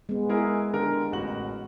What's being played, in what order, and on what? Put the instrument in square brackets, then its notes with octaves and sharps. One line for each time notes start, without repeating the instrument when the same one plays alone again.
[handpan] G#3 B3
[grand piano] E4 G#4 A#4
D3 G4 A#4
A1 F#4 F#7